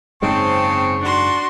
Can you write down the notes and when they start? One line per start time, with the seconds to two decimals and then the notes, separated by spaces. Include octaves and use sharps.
0.22 F#1 G#2 C#3 G#3 C4 A5 C#6
1.02 D4 F#4 C6